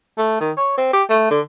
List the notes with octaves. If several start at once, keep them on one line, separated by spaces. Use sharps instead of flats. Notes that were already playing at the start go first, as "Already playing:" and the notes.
A3
D#3
C#5
C4
G4
A3
D3